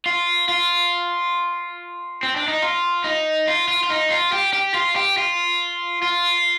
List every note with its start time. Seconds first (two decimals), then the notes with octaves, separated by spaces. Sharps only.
0.06 F4
0.49 F4
2.23 C4
2.36 D4
2.48 D#4
2.62 F4
3.04 D#4
3.48 F4
3.68 F4
3.83 F4
3.90 D#4
4.10 F4
4.33 G4
4.54 G4
4.74 F4
4.96 G4
5.18 F4
6.02 F4